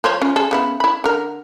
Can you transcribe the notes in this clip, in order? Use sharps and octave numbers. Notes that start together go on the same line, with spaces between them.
F3 C5 C#5
C#4 F4
G#4 A4
C#3 B3 E4
E4 B5
D3 A#4